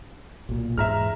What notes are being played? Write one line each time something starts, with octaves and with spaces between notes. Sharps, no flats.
B1 A#2
E2 G#2 G#3 E5 A#5 F6